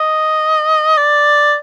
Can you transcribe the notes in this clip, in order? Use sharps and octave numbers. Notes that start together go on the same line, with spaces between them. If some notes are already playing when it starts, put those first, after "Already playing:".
Already playing: D#5
D5